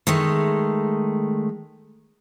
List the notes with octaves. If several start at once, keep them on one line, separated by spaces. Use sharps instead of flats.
D#3 G#3 A3